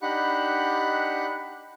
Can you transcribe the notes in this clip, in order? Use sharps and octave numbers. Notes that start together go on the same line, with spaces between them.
D4 D#4 G4 F#5 B5 F#6